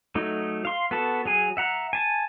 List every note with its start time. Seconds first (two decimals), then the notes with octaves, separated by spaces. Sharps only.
0.15 F#3 A3 D#4
0.65 F5 C6
0.91 B3 F#4 A4 A5
1.25 F#3 G#4 G#5
1.57 E5 F#5 A#5
1.93 G#5 A5